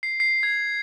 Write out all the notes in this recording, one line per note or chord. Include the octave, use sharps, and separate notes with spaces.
C7
C7
G#6